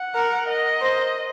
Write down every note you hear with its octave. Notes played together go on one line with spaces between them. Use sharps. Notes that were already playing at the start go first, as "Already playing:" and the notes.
Already playing: F#5
A#4
D#5
C5